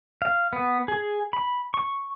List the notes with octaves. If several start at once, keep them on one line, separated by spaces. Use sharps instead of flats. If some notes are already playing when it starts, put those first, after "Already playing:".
F5
B3
G#4
B5
C#6